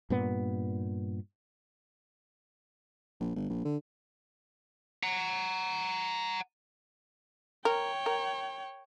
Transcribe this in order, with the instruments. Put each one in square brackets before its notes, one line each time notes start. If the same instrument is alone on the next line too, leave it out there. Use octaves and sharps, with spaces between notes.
[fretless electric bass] G2 A#2 B3
[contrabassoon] A#1
G1
A#1
D3
[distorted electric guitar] F#5 A#5
[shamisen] A#4 [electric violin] C#5 G5
[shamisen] A#4